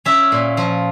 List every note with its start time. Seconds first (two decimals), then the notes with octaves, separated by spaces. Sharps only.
0.05 C#4 E5
0.32 A#2
0.57 F3